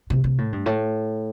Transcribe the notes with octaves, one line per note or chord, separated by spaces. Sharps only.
C3
C3
A2
G2
A2